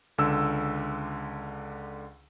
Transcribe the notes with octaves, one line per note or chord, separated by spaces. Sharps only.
C#2 D3 E6